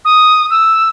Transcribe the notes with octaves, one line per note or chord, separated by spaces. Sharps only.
D#6
E6